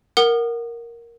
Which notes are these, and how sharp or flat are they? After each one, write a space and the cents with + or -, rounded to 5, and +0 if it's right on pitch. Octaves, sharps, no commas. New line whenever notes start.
A#4 +0 F#5 +0 D#6 -40